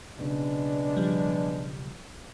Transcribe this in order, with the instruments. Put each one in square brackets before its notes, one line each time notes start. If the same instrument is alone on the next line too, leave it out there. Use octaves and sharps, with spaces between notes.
[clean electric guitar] B1 A2 C#3 [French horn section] G#3 B3 D4
[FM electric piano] F3 G3